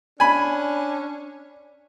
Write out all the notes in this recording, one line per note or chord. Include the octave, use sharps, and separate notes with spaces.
C#4 D4 G#5 B5